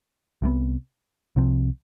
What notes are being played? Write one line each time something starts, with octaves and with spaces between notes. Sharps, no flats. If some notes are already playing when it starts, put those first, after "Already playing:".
C2 C3 G3 B3
C2 C3 F3 C4